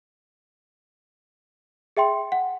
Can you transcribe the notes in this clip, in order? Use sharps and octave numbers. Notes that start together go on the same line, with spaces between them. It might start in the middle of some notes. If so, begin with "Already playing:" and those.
G#4 E5 G5 C6
F#5